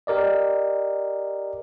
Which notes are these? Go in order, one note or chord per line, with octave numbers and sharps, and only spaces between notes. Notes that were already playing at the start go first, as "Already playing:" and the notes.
G4 A#4 D5 D#5